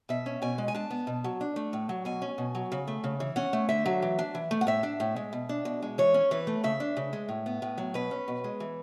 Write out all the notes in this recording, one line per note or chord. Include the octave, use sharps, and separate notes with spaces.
B2 E5
C#4
B2 G#5
G#3
G#5
D4 A5
B3
B2
F#3
D4
A3
A2
F#3
B2 G#5
C#4
B2
F#3
C#3
A3
C#3
E3
C#4 F#5
A3
D3 E5
F#3
E3
D4
E3
A3
F#5
A2 E5
D4
A2
G#3
B2
D4
B2
G#3
E3 C#5
C#4
E3 B4
A3
C#3 E5
D4
C#3
G#3
A2
B3
A2
F#3
B2 B4
C#4
B2
G#3
E3